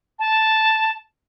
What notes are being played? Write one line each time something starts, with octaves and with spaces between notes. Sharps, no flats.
A5